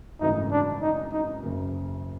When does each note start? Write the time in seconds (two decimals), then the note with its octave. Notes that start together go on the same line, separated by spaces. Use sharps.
0.20 G#1 F#2 C#3 E3 A3 D#4
0.51 D4
0.82 D#4
1.12 D#4
1.43 F#1 F#2 C#3 F#3 A#3